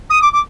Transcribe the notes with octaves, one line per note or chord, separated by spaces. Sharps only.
D#6
D6
D6